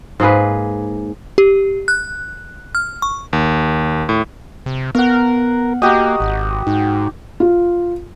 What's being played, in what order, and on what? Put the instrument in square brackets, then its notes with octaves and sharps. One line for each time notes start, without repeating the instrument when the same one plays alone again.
[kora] G#2 A#3 G#4 B4
[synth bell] G4
F#6
F6
C#6
[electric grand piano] D#2
A2
[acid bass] C3
[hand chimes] B3 [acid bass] A#4 [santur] F5 F#5
[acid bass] A#3 [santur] F#4 G4 D#6 [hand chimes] D#5 A#5
[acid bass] G#1
[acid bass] G#2 [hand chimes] D#4
[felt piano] F4